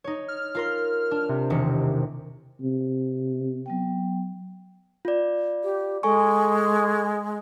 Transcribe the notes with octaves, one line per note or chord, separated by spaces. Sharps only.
D#4 C#5
F6
F4 A#4 C6
D4
C3
E1 D#3 C#7
C3
F#3 B3 G5
F4 D5
G4
G#3 A4 G#5 C#6